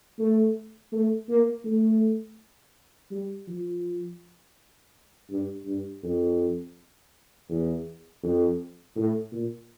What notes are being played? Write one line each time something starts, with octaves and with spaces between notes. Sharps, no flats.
A3
A3
A#3
A3
G3
F3
G2
G2
F2
E2
F2
A2
A#2